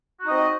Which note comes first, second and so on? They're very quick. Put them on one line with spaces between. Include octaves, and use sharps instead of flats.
F#4 D#4 D#5 C4